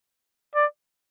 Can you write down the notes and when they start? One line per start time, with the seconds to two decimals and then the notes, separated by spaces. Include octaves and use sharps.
0.55 D5